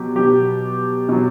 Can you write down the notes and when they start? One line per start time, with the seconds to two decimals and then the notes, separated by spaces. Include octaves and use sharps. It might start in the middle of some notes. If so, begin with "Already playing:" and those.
Already playing: B2 F#3 G4
0.15 B2 F#3 G4
1.09 B2 F#3